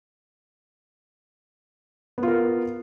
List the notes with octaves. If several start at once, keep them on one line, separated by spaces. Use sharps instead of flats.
B3 F4 A#4